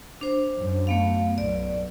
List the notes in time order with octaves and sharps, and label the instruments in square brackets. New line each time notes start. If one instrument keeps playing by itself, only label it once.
[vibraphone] D4 C5
[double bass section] F#2
[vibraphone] A3 B3 F5
[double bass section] B1 [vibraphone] D5